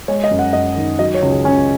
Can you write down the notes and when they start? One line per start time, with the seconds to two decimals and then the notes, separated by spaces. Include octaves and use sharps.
0.08 G#3 C#5
0.24 D#5
0.31 F#2
0.39 F#5
0.53 F#2 D#5
0.76 D#3
0.99 F#3 D#5
1.14 C#5
1.22 C#2
1.30 G#4
1.45 C#2 C#4